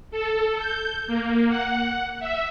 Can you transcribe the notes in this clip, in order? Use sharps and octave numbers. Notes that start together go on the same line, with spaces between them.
A4
G6
A#3
F#5
E5